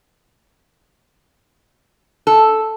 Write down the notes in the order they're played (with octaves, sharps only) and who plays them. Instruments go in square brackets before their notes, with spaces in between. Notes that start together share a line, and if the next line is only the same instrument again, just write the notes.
[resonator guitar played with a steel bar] A4